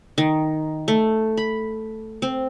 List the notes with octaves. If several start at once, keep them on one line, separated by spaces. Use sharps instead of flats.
D#3
A3
B5
C4